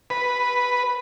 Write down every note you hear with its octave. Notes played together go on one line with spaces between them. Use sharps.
B4